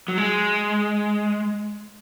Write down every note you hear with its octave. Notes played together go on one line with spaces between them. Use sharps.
F#3
G#3